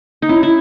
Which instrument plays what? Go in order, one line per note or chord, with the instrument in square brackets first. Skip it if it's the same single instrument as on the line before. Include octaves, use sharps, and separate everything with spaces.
[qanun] D#4
[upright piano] C#4 [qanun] E4
[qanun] E4